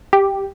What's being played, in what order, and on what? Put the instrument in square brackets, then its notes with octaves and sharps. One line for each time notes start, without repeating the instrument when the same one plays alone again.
[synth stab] G4